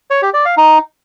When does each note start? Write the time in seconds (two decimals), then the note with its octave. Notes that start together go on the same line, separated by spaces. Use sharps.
0.10 C#5
0.22 G4
0.34 D5
0.45 F5
0.57 D#4